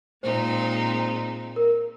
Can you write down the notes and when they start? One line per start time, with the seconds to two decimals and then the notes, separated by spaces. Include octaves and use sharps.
0.23 A#2 G#3 C4 D#4 C5
1.56 A#4